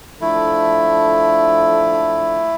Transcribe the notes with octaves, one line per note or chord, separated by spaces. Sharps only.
F3 A3 D4 E4 A4